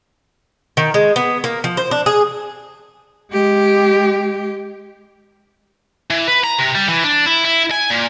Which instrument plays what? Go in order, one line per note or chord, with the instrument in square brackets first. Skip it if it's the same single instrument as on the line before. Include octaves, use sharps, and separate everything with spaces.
[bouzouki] D#3
G#3
B3
A#3
F3
C5
D4
G#4
[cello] G#3 G4
[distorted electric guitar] E3
B4
A#5
C3
G3
E3
D4
E4
E4
G#5
A#2